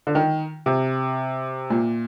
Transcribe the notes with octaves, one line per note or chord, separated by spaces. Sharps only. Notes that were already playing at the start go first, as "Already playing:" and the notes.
D3
D#3
C3
A#2